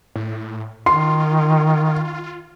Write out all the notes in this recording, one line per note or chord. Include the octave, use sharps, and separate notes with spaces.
A2
D#3 F4 C6